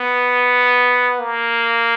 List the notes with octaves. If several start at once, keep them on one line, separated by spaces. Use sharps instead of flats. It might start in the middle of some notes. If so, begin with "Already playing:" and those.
Already playing: B3
A#3